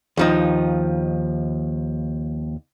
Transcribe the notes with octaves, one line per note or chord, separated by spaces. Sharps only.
D#2 F3 D#4